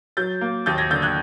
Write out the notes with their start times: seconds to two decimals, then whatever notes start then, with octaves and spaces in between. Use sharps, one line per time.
0.17 F#3 G6 A6
0.41 A#3
0.66 D#2 G6 A6
0.78 G#6 A#6
0.91 D3 G6 A6
1.02 F#6 G#6